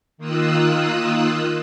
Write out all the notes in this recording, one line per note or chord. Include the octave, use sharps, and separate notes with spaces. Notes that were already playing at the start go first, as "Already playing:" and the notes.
D#3 A#3 F4 D#6 E6 F#6